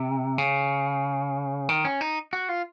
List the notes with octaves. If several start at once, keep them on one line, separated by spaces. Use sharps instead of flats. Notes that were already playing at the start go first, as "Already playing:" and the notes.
Already playing: C3
C#3
D#3
C#4
D#4
F#4
F4